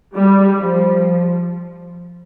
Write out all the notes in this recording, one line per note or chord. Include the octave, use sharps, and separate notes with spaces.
G3
F3